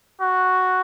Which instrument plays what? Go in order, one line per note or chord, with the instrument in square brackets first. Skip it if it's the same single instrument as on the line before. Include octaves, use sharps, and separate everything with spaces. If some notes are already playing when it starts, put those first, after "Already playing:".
[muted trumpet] F#4